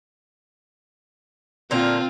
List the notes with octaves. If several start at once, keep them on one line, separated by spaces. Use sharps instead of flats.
A#2 D3 C4 F4 A#4